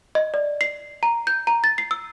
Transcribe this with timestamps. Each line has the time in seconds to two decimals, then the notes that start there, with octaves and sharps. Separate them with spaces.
0.15 D#5
0.34 D5
0.61 C7
1.03 A#5
1.27 G6
1.47 A#5
1.64 A6
1.78 C7
1.91 E6